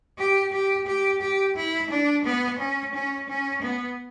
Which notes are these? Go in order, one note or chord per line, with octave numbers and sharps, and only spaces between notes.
G4
G4
G4
G4
E4
D4
B3
C#4
C#4
C#4
B3